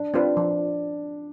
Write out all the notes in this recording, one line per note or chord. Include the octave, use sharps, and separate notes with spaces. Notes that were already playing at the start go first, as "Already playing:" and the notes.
Already playing: D4
C4 D4 F4 B4
F3